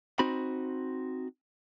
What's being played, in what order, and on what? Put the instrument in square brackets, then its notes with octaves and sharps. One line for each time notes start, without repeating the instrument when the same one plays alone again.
[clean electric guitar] C4 D#4 F#4 B5